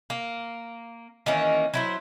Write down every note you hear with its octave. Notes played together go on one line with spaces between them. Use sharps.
A#3
D#3 E3 A#3 C#4
F#3 E4 C5